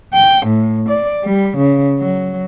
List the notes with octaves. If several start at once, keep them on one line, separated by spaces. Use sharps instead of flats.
G5
A2
D5
G3
C#3
F#3